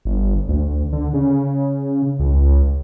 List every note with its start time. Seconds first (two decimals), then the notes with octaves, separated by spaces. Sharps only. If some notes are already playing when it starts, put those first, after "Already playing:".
0.05 G1
0.48 D2
0.93 D3
1.13 C#3
2.19 C#2